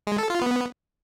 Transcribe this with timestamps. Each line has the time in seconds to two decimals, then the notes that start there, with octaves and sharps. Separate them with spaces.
0.07 G#3
0.18 A4
0.30 F4
0.41 B3